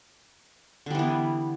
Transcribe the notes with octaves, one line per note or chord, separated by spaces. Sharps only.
D3 E3 G3 B3